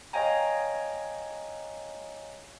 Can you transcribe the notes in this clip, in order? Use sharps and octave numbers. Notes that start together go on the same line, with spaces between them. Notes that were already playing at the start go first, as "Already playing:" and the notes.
C#5 D#5 F5 G5 G#5 A#5